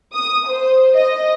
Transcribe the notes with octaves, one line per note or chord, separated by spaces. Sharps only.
D#6
C5
D#5